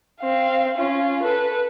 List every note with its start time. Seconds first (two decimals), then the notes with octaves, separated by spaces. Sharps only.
0.20 C4 F5
0.77 C#4 F4
1.23 A4 B4